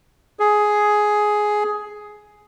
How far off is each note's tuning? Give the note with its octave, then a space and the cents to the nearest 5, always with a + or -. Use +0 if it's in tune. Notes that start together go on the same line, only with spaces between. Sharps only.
G#4 +10